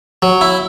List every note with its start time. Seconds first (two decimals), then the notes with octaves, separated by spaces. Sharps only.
0.22 F#3
0.41 E4